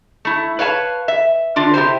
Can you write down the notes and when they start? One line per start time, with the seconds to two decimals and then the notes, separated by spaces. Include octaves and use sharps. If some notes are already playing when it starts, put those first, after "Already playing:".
0.25 A3 E4
0.59 B4 C#5 F5 A5
1.08 E5
1.56 D3 D4 F4
1.74 C3 E4 G4 B4 C5